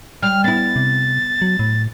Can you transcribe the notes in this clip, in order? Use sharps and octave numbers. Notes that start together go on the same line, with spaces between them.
G3 F6
B3 E4 A6
C3
F#3
A2